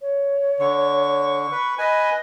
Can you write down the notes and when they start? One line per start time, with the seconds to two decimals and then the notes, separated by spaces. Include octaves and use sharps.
0.01 C#5
0.60 D3 C#6
1.52 B4
1.78 B4 D#5 G#5